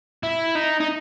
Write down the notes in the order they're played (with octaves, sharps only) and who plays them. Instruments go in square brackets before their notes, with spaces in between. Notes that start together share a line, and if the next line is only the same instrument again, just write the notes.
[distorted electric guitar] E4
D#4
D#4